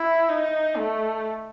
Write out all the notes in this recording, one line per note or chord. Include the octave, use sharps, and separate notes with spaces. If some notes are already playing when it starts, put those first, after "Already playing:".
Already playing: E4
D#4
A3